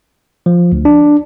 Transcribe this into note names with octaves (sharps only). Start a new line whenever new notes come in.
F3
D2
D4